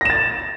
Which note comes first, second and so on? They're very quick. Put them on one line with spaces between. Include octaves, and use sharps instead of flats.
A#6 E7 A6